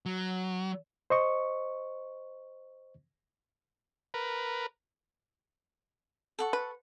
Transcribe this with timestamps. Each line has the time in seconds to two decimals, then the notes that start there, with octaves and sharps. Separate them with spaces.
0.06 F#3
1.10 C5 D#5 C#6
4.14 A#4 B4
6.39 A4 F#5 C#6
6.53 B4